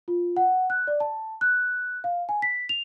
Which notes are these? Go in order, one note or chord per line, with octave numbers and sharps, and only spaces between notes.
F4
F#5
F#6
D5
A5
F#6
F5
G#5
B6
F7